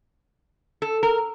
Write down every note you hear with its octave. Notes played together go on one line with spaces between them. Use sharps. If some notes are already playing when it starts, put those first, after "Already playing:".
A4
A#4